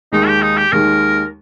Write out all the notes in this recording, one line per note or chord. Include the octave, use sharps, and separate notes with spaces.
D#2 D#3 G#3 D#4
G4
D#4
G4
D#2 D#3 G#3 A#4